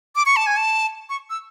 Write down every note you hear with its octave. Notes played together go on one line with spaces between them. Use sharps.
D6
C#6
A5
G#5
A5
C#6
E6